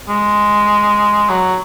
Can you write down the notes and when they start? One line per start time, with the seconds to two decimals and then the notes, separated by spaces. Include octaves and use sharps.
0.09 G#3
1.29 F#3